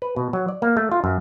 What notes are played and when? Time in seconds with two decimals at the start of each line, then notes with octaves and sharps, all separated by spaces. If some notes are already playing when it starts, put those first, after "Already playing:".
0.02 B4
0.16 B2
0.33 F#3
0.48 D5
0.62 A#3
0.77 A3
0.92 F4
1.04 F#2